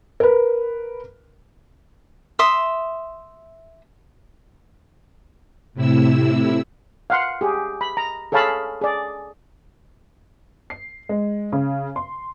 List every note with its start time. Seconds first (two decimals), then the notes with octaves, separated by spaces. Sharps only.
0.20 A#4 B4
2.39 E5 C6 D#6
5.74 A2 C3 E4 E6
7.10 F5 F#5 C6
7.41 G4 G#4
7.81 B5
7.97 A#5
8.32 G#4 A4 C#5 F5 A5 B5
8.81 G#4 D5
10.70 C7
11.09 G#3
11.52 C#3
11.96 C6